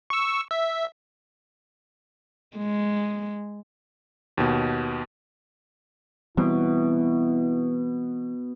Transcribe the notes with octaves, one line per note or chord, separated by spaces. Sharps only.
C#6 E6
E5
G#3
D#2 B2
B2 E3 G3 C4 E4